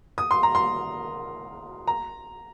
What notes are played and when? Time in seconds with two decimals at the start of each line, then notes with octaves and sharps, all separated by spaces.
0.18 D#6
0.31 C6
0.43 A#5
0.55 C6
1.87 A#5